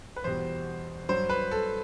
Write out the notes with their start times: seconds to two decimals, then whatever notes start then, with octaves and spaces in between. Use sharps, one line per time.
0.16 B4
0.24 E2 B2 G3 C5
1.09 G2 F#3 C5
1.30 B4
1.51 A4